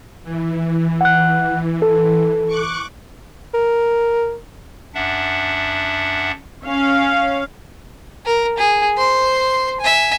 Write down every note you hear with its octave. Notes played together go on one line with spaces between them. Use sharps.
E3
F#5 F#6
A4
C#6 D6 F#6
A#4
F#2 D4 E5 F#5
C#4 F5
A#4
G#4
C5 C6
E5 G#5